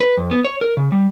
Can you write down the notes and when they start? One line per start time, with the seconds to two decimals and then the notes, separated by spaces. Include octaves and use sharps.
0.01 B4
0.17 F2
0.31 B3
0.44 C#5
0.61 A#4
0.77 C#3
0.92 G3